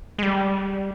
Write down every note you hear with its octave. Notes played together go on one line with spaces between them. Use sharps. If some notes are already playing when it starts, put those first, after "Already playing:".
G#3
G3